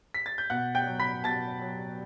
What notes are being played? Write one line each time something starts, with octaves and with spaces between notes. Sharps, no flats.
B6
A6
G6
B2 F#5 F#6
G5 G6
F#3
B5 B6
B2 A5 A6
F#3